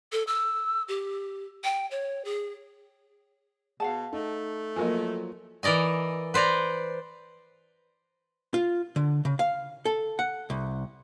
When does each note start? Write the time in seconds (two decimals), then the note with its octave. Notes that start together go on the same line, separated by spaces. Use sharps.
0.12 A4
0.27 E6
0.88 G4
1.64 G5
1.91 C#5
2.24 G#4
3.80 B2 G#4 F5 F#5 A5
4.13 A3 D#4
4.76 F3 F#3 A#3 A#4 D#5 G#5
5.63 E3 A#4 D5 D#5 G#5
6.34 B4 C5 D5 A#5
8.54 F4
8.96 D3
9.25 C#3
9.39 F5
9.85 A4
10.19 F#5
10.50 C2